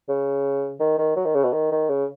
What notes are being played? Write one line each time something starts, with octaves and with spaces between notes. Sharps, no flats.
C#3
D#3
D#3
F#3
D#3
C#3
B2
D#3
D#3
C#3